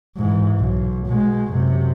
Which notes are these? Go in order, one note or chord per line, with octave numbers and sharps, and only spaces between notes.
G#2 E3
B1
B2 G#3
F#2 C3